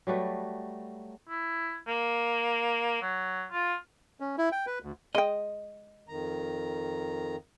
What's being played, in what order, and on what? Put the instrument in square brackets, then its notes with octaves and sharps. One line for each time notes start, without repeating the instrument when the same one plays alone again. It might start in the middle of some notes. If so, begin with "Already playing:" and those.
[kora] F#3 G3 A3 B4
[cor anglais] E4
A#3
F#3
F4
[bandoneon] C#4
E4
G5
B4
D2
[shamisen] G#3 G5 [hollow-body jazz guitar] D#5
[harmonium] F2 D#3 A#5